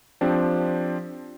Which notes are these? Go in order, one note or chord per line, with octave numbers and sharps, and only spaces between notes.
F3 C4 D4 G4